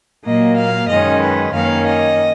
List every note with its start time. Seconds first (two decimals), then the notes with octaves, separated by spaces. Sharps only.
0.24 A#2 F#3 A#3 D#5
0.57 F5
0.89 F#2 D#3 G#3 C#4 D#5
1.21 B4
1.53 F#2 D#3 A#3 C#4 F5
1.86 D#5